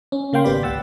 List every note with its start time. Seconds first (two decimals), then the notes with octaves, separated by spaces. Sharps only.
0.12 C#4
0.33 C#3 A#3 F5 G5 C6
0.44 G#1 B3 G4 D5 B5
0.63 C#2 F#5 E6 A6